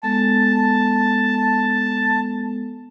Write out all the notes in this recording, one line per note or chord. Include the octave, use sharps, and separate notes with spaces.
G#3 B3 A4 A5